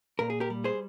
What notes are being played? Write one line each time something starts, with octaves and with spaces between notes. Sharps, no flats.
A#2 A#4
G#4
G4 A#4
G3
G#4 C5